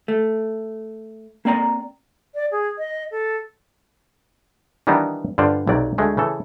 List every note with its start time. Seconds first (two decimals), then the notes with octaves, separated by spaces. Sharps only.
0.08 A3
1.45 A#3 C4 D5 A#5
2.35 D5
2.52 G#4
2.78 D#5
3.11 A4
4.87 D#3 E3 G3 B3 D4 D#4
5.38 G2 D3 F4 C5 D5
5.67 B1 C3 F#3 D5
5.98 D2 G#3 A3
6.17 C#3 E3 A4